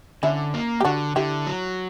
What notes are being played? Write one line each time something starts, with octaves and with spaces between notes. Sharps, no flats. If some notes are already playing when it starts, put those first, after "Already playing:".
D3 C#4 E4
A#3
G4
D3 D4 F#4
D3 E4 G4
F#3